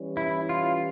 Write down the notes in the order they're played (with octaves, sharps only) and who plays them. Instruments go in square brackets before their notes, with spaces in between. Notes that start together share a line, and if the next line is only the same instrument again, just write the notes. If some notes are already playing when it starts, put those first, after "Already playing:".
Already playing: [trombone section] E3 G3 C#4
[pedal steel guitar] E4
F4